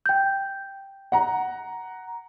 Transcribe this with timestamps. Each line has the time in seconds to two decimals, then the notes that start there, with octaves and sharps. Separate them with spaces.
0.06 G5 G6
1.12 F#5 A#5